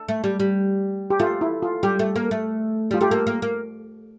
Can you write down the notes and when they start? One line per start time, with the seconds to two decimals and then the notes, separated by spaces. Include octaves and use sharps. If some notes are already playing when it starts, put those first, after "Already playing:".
Already playing: A4
0.08 A3
0.24 G3
0.40 G3
1.10 G4
1.20 A3 F4
1.41 E4
1.63 F4
1.83 G3 G4
1.99 A3
2.16 A#3
2.31 A3
2.91 G3 F4
3.01 A3 G4
3.11 A#3 A4
3.27 A#3
3.42 A#3